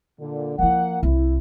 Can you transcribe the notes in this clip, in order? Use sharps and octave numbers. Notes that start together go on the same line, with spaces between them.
A#2 D3
F3 A#3 E4 F#5
C2 E4